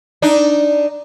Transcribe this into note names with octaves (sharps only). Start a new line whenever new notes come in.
D4 D#4